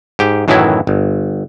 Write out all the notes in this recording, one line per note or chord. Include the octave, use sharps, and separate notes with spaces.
G#2 G4
F#2 A2 D#3 E3 F#3 E4
G1